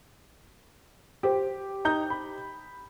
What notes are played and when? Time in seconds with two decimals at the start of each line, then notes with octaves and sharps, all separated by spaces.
1.23 G4 C5
1.85 D#4 A#5 G6
2.10 B5